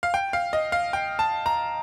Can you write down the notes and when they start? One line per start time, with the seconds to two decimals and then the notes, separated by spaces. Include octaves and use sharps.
0.03 F5
0.14 G5
0.33 F5
0.53 D#5
0.72 F5
0.93 G5
1.19 A5
1.46 A#5